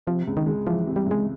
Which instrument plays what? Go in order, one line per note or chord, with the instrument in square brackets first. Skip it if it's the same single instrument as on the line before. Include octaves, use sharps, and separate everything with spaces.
[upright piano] C3 [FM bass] F3
[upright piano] C#2
[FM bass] D#3
[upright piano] G#3
[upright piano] E3 [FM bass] F3
[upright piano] C3
[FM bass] G3
[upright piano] C#2 [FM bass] G#3